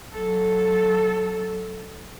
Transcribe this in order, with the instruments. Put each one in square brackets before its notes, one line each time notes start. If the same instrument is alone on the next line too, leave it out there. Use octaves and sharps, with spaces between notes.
[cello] F#3 A4